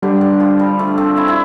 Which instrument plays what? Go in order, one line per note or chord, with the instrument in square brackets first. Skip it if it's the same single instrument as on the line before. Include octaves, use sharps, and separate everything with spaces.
[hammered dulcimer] D3 [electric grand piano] G3 D4 G4 D5
[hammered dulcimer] D3
F3
G3
F3 A3
A3 C4
C4 E4
E4